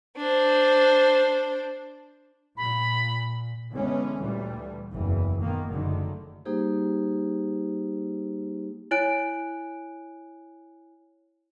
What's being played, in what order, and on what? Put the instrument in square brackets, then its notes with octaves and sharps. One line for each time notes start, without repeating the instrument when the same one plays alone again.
[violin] D4 C5
[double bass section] A#2 [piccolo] B5
[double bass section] D3 E3 G#3 B3 C#4
D2 A#2 E3 G3 A3
F#1 E2 E3
A#2 D#3 A#3 B3
F#1 F#2 D3 D#3 A3
[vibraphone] G3 A#3 D#4 G4 G#4 C5
[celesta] E4 C#5 G#5 F#6 D7